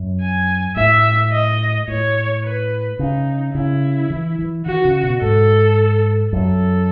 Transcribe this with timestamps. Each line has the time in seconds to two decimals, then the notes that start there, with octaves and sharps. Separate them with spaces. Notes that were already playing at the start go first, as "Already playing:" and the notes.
Already playing: F#2
0.21 G#5
0.77 A2 E5
1.33 D#5
1.88 A2 C#5
2.44 B4
2.99 C#3 D#4
3.54 C#3 E4
4.10 E3
4.39 E3
4.66 D#3 F#4
4.85 C#3
5.03 B2
5.22 G#2 A4
6.33 F#2 A4